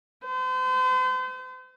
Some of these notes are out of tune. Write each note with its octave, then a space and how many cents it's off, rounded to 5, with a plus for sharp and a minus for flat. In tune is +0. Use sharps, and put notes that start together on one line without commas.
C5 -40